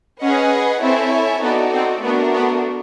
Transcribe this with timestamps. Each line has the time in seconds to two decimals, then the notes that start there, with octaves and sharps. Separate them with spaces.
0.21 C#4 G#4 B4 D#5 F#5
0.81 C4 E4 A4 C#5 E5 G#5
1.41 B3 D#4 F#4 A4 D5
1.72 C4
2.02 A3 B3 D4 F#4 A#4
2.33 B3